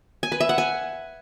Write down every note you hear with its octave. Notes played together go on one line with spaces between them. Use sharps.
G#5
B4
E5
F#5
G#5